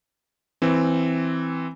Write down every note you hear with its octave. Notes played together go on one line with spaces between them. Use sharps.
E3 C4